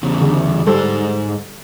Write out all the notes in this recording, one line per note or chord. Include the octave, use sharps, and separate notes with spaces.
E2 C#3
D3
G#2 G3 A4 C5